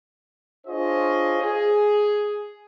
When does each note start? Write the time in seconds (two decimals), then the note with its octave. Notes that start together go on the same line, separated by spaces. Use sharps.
0.66 D4 F4 G#4 C5 C#5 D#5
1.42 G#4